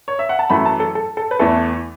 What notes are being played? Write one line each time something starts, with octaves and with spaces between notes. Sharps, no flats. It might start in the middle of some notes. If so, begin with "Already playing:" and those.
C#5
E5
F#5
A5
F#2 E3 A3 B5
A5
A4
A4
A4
B4
E2 E3 A3 A4